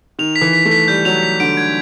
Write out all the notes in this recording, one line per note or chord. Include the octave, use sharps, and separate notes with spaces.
D#3 F7
B6
E3
B6
A3
B6
G3 G6
F#3 F7
B6
D3 D7
G#6